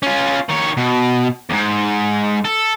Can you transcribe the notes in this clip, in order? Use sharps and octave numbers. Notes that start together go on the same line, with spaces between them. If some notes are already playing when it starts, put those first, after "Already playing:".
C#4 F4
D#3 C#5
B2
E2 G#2
A4